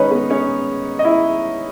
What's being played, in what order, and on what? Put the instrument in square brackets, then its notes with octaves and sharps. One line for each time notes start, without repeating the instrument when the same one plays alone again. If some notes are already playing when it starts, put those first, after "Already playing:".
Already playing: [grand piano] D#3 G#3 C#4 D#4 B4 C#5 D#5
B3 B4
C#4 C#5
D#5
E4 E5